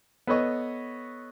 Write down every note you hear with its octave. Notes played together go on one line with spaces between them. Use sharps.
B3 A4 B4 C#5 D#5 C#6